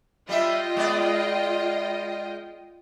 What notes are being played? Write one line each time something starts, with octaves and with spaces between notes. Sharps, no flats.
G3 F4 D#5 E5 G5
G#3 B3 D5